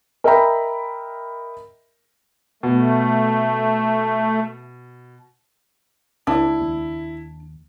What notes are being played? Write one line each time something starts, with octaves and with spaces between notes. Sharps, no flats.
A#4 D#5 E5 G5 A#5 B5
B2 A3
C#2 D4 E4
D#2